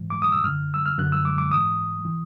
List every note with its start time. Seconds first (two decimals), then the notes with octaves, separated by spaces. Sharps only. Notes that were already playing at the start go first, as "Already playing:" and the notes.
Already playing: G#2 E3
0.10 D6
0.22 D#6
0.32 E6
0.44 F#2 D3 F6
0.74 E6
0.86 F6
0.98 F#2 D3 F#6
1.12 E6
1.25 D6
1.38 D6
1.51 G#2 E3 D#6
2.05 E3